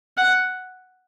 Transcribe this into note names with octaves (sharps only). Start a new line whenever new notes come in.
F#5